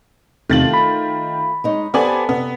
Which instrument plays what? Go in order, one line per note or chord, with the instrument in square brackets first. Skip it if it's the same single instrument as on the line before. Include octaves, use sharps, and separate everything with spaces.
[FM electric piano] E2 C3 [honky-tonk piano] D#3 A6 F#7 [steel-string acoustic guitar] A3 F4
[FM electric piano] B5
[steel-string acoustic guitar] G#3 D#4 C#5
[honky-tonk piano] B3 D5 G#5 [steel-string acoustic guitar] G4 A4 C5
[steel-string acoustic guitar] C3 D5 [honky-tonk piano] B3